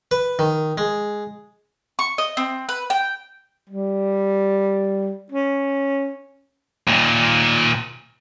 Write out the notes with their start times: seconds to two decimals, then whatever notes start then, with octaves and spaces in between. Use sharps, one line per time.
0.11 B4
0.39 D#3
0.78 G#3
1.99 C#6
2.18 D#5
2.37 C4
2.69 B4
2.90 G5
3.69 G3
5.32 C#4
6.88 D#2 A#2